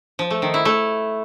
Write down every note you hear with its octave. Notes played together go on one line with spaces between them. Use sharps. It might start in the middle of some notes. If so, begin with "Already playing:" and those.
F3
A3
D#3
E4
A3